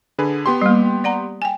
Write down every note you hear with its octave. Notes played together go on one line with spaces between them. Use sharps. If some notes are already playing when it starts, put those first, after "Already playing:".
D3 G#4 B4
B3 G4 C6
G3 A#3
D5 F#5 A#5
G5 G#5